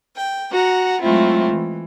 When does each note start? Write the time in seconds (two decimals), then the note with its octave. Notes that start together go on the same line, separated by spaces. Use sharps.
0.16 G5
0.52 F#4 F#5 A#5
1.01 F#3 G#3 A3 C4 E4 F4
1.52 E3